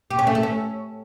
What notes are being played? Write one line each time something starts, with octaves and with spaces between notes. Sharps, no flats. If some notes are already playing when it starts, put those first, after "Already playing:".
G4
C#4
A3
A4
C#4